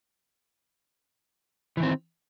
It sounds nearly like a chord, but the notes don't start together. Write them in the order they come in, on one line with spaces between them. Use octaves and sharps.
E3 D#3 C4